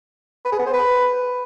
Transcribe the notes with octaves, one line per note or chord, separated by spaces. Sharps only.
B4
G#4
B3
C5
B4